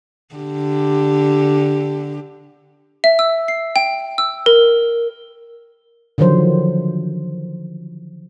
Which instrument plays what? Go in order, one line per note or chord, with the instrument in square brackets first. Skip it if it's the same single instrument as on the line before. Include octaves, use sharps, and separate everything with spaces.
[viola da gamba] D3 G4
[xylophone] E5
E6
C7
G5
E6
A#4
[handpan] D3 D#3 F3 F#3 C5